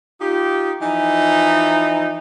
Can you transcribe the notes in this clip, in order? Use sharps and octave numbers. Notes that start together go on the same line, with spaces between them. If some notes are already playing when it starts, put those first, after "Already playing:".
D#4 F4 G4
E3 F3 D#4